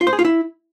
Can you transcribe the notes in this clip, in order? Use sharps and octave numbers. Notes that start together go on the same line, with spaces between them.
F4
C5
G#4
F4
E4